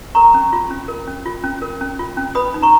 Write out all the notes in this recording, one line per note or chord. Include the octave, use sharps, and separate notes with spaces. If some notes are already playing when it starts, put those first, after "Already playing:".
A#4 A#5 C#6
C#4
F4
C#4
A#4
C#4
F4
C#4
A#4
C#4
F4
C#4
B4 B5 D#6
D#4
A#5 C#6